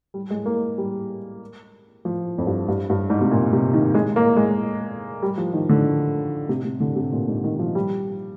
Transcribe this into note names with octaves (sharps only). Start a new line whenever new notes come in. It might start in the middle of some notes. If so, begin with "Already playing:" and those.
G3
G#3
A#3
G3
F3
F2
G2
G2
G2
G#2
C3
A#2
C3
D#3
G#3
A#3
G#3
G3
F3
D#3
D3
C3
C3
D3
C3
A#2
G#2
D#3
F3
G3